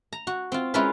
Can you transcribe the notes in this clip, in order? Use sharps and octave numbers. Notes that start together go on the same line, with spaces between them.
A#5
F#4
C4 F4
G#3 C#4 E4 F4 A#4 B4